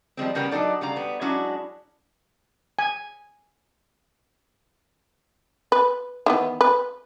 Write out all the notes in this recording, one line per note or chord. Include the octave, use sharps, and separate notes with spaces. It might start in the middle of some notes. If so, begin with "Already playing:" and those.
F3 G3 G#3 C4
C#3 G3 B3 A#4 G5
F#3 D4 D#4 A4 D5
C#3 G3 F5 A#5
G3 B3
F#3 G#3 C#4 D4 E4 F#4
G#5
B4
D#3 E3 B3
B4